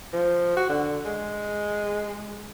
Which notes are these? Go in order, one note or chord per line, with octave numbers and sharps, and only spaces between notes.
F3
F#4
D3
G#3